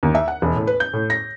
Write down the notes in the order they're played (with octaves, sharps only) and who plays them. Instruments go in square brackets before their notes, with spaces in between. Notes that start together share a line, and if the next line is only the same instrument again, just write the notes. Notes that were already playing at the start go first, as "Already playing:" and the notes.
[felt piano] D#2
E5
F#5
E1
A2
B4
G6
A2
A#6